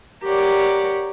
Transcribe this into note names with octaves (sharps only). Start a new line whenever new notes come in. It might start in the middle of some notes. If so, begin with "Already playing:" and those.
G4 A#4 C#5 D5 F#5